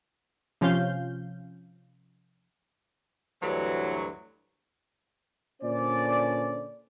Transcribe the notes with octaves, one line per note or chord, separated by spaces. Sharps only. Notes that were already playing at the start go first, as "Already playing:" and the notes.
C3 F3 C#4 F4 F5 G6
D2 G2 E3 F#3
A#2 D3 C#4 C5 D5